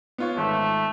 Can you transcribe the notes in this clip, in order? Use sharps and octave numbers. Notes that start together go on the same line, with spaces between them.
B3 F4 C#5
G#1 A3